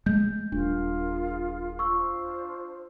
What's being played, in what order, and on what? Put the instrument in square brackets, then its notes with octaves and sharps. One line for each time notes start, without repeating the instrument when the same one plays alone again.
[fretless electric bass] G#3 A3 [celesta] G6
[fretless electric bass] D#1 [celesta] D4 [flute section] F4 G#4 A#4
[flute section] D4 F4 C5 [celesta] C#6 E6